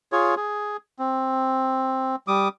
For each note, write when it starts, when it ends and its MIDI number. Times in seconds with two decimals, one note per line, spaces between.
0.12 0.35 65
0.12 0.35 68
0.12 0.35 73
0.36 0.77 68
0.99 2.16 60
2.28 2.48 55
2.28 2.48 86
2.28 2.48 87